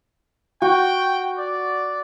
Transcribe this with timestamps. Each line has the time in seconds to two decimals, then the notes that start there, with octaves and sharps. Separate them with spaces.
0.62 F#4 G5
1.38 D5